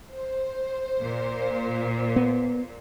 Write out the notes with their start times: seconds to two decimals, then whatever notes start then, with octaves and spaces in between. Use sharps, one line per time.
0.11 C5
1.00 A#2
2.16 B3